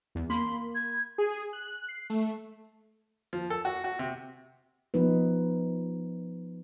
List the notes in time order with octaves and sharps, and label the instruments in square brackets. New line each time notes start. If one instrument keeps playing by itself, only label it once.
[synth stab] E2
[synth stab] A#3 B5 [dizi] C6
[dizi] G#6
[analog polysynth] G#4
F#6
C7
A3
[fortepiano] F3
A4
F#4
F#4
C3
[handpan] F3 B3 D#4 B4